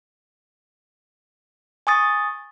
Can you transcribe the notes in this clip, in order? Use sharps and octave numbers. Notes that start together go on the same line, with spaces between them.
G#5 C#6 D#6 A6